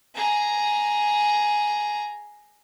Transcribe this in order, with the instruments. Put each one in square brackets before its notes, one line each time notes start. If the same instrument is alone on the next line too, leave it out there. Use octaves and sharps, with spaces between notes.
[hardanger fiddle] G#4 A#5